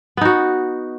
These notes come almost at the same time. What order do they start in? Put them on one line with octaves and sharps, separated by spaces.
B3 D#4 F#4